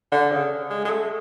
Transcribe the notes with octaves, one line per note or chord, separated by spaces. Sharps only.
D3
C#3
G#3
G#3
A3